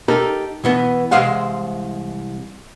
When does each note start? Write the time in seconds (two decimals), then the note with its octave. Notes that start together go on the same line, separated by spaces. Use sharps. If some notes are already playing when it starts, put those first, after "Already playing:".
0.08 D#4 G4 A4 A#4
0.64 B2 E3 B3
1.11 C2 E3 G#3 C5 F5 F#5